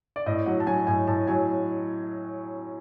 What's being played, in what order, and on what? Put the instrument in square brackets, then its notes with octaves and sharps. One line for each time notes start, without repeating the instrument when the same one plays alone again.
[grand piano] D5
A2 D#5
F#3 F#5
A5
F#3 G#5
A2 G#5
A2 A5
F#3 G#5